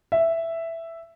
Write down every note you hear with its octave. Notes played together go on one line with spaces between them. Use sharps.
E5